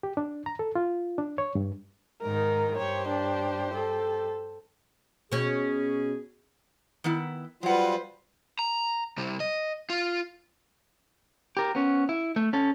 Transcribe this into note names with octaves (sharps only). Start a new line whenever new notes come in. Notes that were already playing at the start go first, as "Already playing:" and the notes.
G4
D4
A#5
A4
F4
D4
C#5
G2
G#2 D#3 D#4 A#4
G2 G4 C5 C#5
D4
A4
B2 C#4 G#4
D#3 B3 E4
F#3 G3 F4 B4 C5 F#5
A#5
C3 G3
D#5
F4
G4 A#4
B3 C#4
E4
A3
C#4 A4